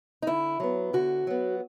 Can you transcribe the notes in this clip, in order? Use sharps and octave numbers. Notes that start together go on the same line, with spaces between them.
D#4
D3 E4
F#3 B3
D3 F#4
F#3 B3